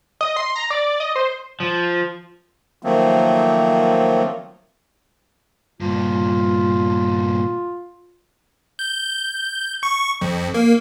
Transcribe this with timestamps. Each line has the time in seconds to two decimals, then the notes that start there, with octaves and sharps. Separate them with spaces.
0.21 D#5
0.37 C6
0.56 A#5
0.70 D5
1.00 D#5
1.16 C5
1.60 F3
2.83 D#3 F3 F#3 A3 A#3 C4
5.81 G2 A#2 F4
8.79 G6
9.83 C#6
10.21 F2
10.54 A#3